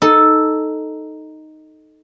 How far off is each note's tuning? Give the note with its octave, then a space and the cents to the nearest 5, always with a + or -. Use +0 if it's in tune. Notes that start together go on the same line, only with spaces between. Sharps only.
D#4 +0 A4 +0